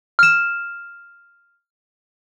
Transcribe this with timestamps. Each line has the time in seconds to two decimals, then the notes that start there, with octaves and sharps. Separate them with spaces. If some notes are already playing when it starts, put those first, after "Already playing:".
0.19 F6 E7